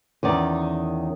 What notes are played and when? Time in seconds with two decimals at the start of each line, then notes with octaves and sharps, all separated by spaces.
0.23 E2 D#3 C#4 D5